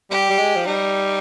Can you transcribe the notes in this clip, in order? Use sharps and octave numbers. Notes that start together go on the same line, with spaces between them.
G3 G4
G3
G#3
F3
G3 D#4